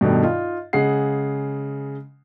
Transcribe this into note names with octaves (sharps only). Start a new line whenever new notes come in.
G2 B2 D#3 A3
D#4 F4
C#3 G#3 G#4 F#5 C7